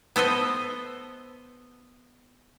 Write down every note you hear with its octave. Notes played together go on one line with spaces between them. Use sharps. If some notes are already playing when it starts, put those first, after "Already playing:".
B3 A4 C5 D#5